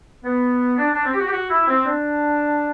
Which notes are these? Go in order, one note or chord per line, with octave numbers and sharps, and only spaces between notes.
B3
D4
D4
C4
G4
F#4
G4
F#4
E4
C4
D4